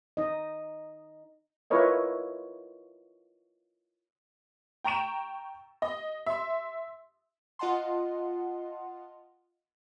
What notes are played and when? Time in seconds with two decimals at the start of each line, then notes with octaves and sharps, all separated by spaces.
0.17 D#4 D#5
1.70 E4 F4 A#4 B4 C#5 D#5
4.84 G5 A#5 C#6 D7 E7
5.82 D#5
6.26 E5 C6
7.59 F4 D#5 F#5 A5 C6